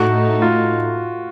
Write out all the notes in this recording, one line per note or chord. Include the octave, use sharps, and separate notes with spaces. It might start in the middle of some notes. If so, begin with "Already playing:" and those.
Already playing: A2 A3 D#4 F#4
F4